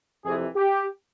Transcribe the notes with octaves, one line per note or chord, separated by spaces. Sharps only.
F2 C3 E3 G#4
G4